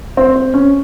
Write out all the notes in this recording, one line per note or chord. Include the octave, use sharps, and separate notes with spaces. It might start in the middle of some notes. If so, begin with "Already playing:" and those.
C4
C4
C#4